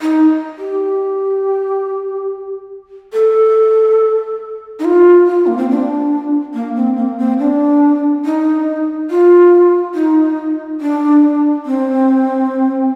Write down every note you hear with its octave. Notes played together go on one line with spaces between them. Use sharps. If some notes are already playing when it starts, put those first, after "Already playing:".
D#4
G4
A4
D#4
F4
F4
A#3
C4
D4
A#3
C4
A#3
C4
D4
D#4
F4
D#4
D4
C4